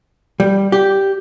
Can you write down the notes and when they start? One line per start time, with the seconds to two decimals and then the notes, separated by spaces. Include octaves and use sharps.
0.40 G3
0.72 G4